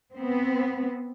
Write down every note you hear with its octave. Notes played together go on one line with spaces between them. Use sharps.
B3 C4